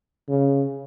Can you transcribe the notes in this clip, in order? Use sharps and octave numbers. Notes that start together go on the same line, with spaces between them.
C#3